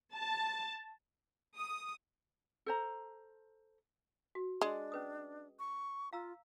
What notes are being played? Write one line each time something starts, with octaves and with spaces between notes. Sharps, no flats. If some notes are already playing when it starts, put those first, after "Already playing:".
A5
D#6
A4 C5 A#5
F#4
G#3 D4
C#4 B4 D#6
C#6
F4 F5 A#5 E6